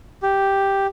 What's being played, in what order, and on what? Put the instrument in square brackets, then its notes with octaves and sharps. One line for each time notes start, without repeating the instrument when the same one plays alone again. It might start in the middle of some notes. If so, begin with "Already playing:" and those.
[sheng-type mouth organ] G4